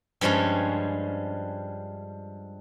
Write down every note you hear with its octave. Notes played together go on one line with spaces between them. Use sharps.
G2 F3 G3 G#3 C#4